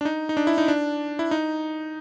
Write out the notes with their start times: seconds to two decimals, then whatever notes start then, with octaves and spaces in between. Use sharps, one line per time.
0.01 D4
0.05 D#4
0.29 D#4
0.37 D4
0.47 E4
0.58 D#4
0.68 D4
1.19 E4
1.31 D#4